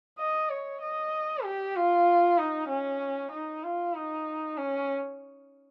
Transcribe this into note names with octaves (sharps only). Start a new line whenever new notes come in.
D#5
C#5
D#5
G4
F4
D#4
C#4
D#4
F4
D#4
C#4